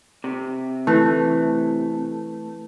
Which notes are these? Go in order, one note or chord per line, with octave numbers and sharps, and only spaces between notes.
C3
E3 A3